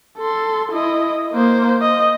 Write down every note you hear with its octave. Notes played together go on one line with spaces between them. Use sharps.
A4 C6
E4 D#5
A#3 C5
D#5